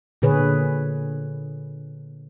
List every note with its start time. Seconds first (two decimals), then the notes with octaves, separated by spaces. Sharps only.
0.22 A#2 D3 G#4 B4 C#5